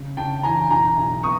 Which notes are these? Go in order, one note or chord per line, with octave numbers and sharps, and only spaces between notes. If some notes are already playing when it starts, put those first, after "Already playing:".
Already playing: C#3
C#3 G5 A5
E3 G#5 A#5
B1 G#5 A#5
B1
B3 C#6 D#6